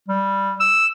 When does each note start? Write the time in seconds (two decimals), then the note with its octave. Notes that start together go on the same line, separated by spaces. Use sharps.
0.09 G3
0.60 E6